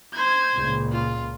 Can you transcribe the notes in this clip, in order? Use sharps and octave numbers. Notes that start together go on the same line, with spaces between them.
C5 G#6
C#2 A#2
F4